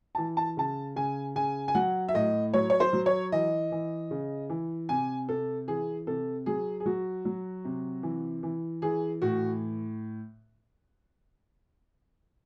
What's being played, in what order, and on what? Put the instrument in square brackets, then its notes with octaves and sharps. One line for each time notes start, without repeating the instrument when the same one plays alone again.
[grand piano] E3 A5
A5
C#3 A5
C#3 G#5
C#3 G#5
G#5
F#3 F#5
E5
A2 D#5
F#3 C#5
C#5
C5
F#3
C#5
E3 D#5
E3
C#3
E3
C3 G#5
C3 A4
E3 G#4
C3 A4
F#3 G#4
G#4
F#3 F#4
F#3
C3
E3
E3
E3 G#4
A2 F#4